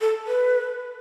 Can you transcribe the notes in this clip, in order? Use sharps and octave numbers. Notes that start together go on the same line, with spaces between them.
A4
B4